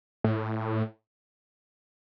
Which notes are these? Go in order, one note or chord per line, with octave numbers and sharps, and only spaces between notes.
A2